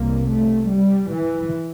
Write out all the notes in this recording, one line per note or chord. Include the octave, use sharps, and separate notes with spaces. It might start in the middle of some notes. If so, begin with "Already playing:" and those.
Already playing: C2 C3 A#3
A3
G3
E3